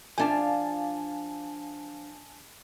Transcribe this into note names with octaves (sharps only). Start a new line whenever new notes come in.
F3 D4 F5 G#5 A5